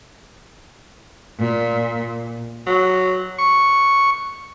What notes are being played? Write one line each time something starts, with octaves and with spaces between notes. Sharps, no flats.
A#2
F#3
C#6